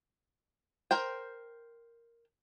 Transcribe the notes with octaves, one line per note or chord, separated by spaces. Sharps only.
A#4 C5 G5